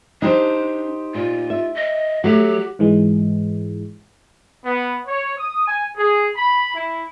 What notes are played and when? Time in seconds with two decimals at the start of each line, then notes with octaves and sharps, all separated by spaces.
0.22 D4 D#4 G4 C5
1.15 A#2 F4
1.50 E5
1.75 D#5
2.24 F#3 A3 F#4 G4
2.79 G#2 E3 G#3
4.64 B3
5.07 C#5
5.38 D#6
5.67 G#5
5.97 G#4
6.35 B5
6.74 E4